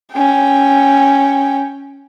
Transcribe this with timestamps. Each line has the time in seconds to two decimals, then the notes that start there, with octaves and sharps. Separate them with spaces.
0.13 C#4 G5